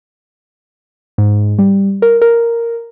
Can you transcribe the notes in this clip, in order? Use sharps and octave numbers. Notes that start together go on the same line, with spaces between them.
G#2
G3
A#4
A#4